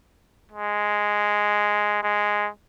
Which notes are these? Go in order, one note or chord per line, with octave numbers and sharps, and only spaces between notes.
G#3
G#3